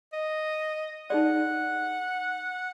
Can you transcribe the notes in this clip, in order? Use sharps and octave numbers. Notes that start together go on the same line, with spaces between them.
D#5
D#4 G#4 D5 F#5